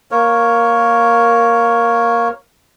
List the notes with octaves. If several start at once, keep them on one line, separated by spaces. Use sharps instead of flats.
A#3 A#4 C#5